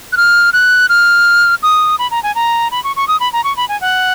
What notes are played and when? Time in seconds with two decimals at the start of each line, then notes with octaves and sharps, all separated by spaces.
0.12 F#6
0.17 F6
0.53 F#6
0.89 F6
1.63 D#6
1.99 B5
2.11 A#5
2.23 G#5
2.35 A#5
2.71 B5
2.84 C#6
2.96 C#6
3.08 D#6
3.20 B5
3.33 A#5
3.44 C#6
3.57 B5
3.68 G#5
3.81 F#5